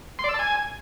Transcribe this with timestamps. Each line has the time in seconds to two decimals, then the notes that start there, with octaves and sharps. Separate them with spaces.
0.19 C6
0.24 D5
0.29 E6
0.34 A5
0.39 G#5